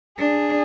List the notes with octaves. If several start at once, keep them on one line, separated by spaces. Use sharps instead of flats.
D4 G#4